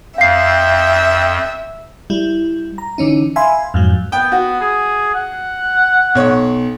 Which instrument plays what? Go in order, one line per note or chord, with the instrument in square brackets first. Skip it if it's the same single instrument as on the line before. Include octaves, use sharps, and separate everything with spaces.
[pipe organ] F2 [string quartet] E5 [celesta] F5 C7 [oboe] G5
[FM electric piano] G3 E4
A#5
D3 E3 C#4 D#4
E5 F5 G#5 B5 C6
F2 G#2 F#3
[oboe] B3 [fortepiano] G5
[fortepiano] F#4
[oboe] G#4
F#5
[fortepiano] B1 C#5